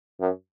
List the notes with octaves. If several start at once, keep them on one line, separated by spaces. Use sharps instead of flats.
F#2